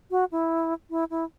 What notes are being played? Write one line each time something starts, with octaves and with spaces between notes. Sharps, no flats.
F#4
E4
E4
E4